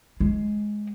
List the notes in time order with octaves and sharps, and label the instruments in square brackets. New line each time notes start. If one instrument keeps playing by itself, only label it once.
[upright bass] G#3